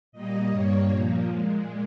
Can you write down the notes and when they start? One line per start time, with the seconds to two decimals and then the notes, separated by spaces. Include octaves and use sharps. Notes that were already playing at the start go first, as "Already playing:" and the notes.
0.12 A#2 G3 A#3 D#5
0.50 G2 G3 A#3 C#5
0.88 A#2 F3 A#3
1.27 A#2 G#3